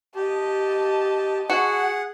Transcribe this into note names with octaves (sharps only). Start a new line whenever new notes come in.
G4 D#5 A5
F#4 G#4 F#5